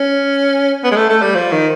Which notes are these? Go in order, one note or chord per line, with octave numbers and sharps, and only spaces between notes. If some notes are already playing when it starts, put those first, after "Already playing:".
Already playing: C#4
B3
G#3
A3
A3
G3
F3
D#3